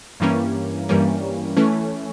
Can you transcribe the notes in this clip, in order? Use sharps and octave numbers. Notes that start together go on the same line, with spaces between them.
G2 E3 G3 A#3 C#4
G2 E3 G3 A#3 C#4
E3 A3 C#4